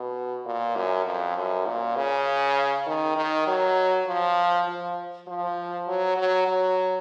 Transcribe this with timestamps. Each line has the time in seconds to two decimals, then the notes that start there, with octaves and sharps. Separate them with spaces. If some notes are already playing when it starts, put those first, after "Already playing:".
Already playing: B2
0.46 A#2
0.76 F#2
1.05 F2
1.36 F#2
1.66 A#2
1.96 C#3
2.87 D#3
3.16 D#3
3.47 F#3
4.07 F3
4.67 F3
5.27 F3
5.88 F#3
6.18 F#3
6.48 F#3